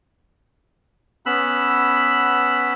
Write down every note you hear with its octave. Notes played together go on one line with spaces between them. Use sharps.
B3 C#4 B5 E6 F#6